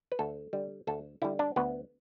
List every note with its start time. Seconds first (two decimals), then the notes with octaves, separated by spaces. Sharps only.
0.12 B4
0.19 D2 A4
0.53 D3 G3
0.87 D2 A4
1.22 D3 G3 E4
1.39 D4
1.56 D2 B3